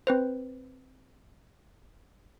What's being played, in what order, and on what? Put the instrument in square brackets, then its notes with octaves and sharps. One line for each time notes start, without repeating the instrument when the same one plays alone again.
[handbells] C4 B4 C5